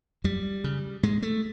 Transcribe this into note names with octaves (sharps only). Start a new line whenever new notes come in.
F#2 G3
C#3
G#2 G#3
A3